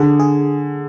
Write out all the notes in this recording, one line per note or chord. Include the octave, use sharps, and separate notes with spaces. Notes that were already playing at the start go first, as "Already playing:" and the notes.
Already playing: D3 G#4
G#4